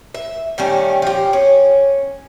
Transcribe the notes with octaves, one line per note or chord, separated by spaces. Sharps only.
E5
D#3 G3 A3 C#4
F3 G4
C#4